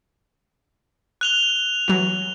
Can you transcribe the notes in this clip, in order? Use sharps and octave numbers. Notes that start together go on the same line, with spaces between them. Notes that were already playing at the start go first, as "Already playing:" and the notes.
F#6 F7 G7
E3 F#3